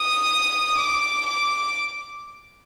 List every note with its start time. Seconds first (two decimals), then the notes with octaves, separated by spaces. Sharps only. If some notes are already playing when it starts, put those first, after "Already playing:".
Already playing: D#6
0.78 D6
1.26 D6